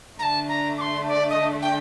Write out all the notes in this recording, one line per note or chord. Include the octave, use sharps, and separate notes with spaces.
D3 A3 D4 A5 A#5
A#5
D6
C6
D5
D#5
G5